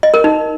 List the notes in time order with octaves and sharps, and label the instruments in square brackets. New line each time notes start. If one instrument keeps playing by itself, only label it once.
[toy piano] D#5
A#4
D#4